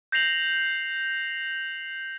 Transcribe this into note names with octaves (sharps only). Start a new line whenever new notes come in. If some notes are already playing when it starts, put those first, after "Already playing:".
G6 A#6 C7 F7 F#7